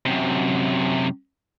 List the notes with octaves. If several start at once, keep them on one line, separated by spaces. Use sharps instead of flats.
F#2 C3